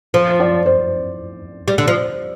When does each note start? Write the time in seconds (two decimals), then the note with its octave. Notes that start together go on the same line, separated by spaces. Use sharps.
0.14 F3 C5
0.40 D5
0.66 C5
1.68 G3
1.78 D3
1.88 F3